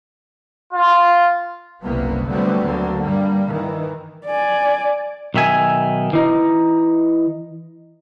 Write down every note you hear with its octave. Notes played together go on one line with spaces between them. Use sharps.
F4
F#1 C2 C3 A#3 B3
D3 F#3 G3 A3 B3 C4
D2 D3 F#3 A#3
G2 G3 A#3
D#3 E3
D5 G#5
B1 D#3 E5 G#5
E3 D#4